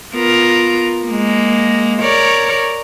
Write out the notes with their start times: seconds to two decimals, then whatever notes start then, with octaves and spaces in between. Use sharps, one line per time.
0.13 B3 F4 A#4
1.06 G#3 A#3
2.01 A#4 C#5 D5